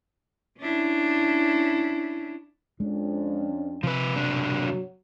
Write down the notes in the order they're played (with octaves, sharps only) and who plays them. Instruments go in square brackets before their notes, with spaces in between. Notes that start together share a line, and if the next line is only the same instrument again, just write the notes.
[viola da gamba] C#4 D4 E4
[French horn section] F2 C#4 D4 [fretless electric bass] G#3
[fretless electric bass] C3 [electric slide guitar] F3 B4
[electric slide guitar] F#2 B2 D4
[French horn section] F#3